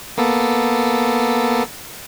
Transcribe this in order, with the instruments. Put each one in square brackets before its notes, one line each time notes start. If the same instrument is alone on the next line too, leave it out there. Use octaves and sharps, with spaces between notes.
[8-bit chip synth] A#3 B3 A4